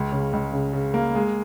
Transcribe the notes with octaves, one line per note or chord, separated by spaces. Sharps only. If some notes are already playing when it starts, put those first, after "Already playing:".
Already playing: C#2
C#3
C#2
C#3
C#3
A#3
G#3